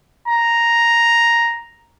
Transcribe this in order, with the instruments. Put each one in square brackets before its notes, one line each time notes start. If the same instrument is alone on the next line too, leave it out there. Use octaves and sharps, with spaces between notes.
[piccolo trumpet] A#5